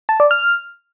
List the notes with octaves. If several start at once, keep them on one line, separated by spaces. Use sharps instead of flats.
A5
D5
F6